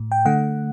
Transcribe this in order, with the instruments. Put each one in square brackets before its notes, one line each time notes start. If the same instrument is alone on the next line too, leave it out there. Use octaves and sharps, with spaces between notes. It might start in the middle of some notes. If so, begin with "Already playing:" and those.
Already playing: [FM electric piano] A2
G5
D3 A3 F#5